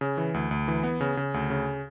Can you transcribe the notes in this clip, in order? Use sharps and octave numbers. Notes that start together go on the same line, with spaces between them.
C#3
E3
D2
D2
E3
B3
C#3
C#3
D2
C#3